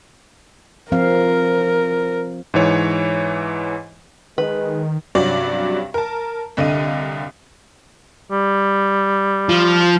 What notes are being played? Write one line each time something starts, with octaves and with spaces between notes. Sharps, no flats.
F3 C4 A#4 F5
G#2 E3 C#5
D#3 G#3 B4
G2 C3 F#3 C#4 D5
A#4 A5
C2 D3 D#5 F5 D#7
G3
F3